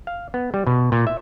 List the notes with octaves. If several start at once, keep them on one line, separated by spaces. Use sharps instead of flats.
F5
B3
G3
B2
A#2
E5